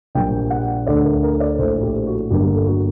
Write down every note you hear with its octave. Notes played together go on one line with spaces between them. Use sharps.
A#1 A#2 G3 G5
F#5
D2 D3 A3 D5
A#4
A#4
D5
A#1 A2 A3 C5
G4
F#4
G1 G2 D3 G3 A#3 G4
A4
F#4